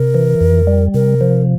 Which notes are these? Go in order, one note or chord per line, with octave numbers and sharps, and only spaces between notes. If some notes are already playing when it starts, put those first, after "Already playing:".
Already playing: C3 A#4
E3
F2
G3
C3 A#4
F3